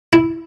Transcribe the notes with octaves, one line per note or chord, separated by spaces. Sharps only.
E4